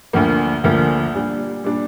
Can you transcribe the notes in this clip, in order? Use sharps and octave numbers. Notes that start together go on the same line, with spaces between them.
D2 D3 F3 A#3
D2 D3 F3 A#3
A#2 G3 D4
A#2 G3 D4